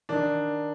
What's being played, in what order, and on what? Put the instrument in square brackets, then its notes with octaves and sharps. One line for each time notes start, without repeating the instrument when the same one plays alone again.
[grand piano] D#3 D4